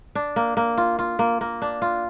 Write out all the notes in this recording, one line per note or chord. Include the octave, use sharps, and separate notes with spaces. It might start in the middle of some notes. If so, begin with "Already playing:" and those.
D4
A#3
A#3
F4
F4
A#3
A#3
D4
F4